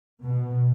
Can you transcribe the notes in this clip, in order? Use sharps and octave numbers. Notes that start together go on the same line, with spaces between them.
B2